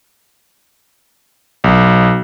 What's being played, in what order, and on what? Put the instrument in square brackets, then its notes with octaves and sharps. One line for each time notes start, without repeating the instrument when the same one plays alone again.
[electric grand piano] B1